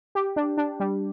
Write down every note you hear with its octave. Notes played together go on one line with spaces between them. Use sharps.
G4
D4
D4
G3